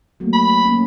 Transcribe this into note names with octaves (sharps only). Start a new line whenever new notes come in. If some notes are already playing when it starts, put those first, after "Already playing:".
F#3 A3 A#3
B5
A#3 C#4